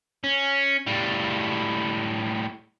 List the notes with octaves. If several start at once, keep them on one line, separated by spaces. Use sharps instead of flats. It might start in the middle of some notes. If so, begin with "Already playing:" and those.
C#4
A2 G3